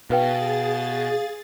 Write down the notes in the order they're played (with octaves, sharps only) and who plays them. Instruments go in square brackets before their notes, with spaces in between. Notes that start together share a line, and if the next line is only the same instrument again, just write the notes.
[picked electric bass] B2 [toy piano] D#4 B4 G5 [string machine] G#4 A6 [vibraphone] F5